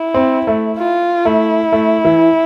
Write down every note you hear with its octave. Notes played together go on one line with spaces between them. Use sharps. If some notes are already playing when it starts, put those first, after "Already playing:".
Already playing: E4
C4
A3
F4
A3 E4
A3
E3